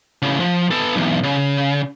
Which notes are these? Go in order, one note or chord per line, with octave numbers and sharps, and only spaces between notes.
A2 C#3
F3
B3 A4
B1 E2
C#3